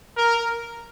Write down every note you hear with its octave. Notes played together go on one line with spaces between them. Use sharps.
A#4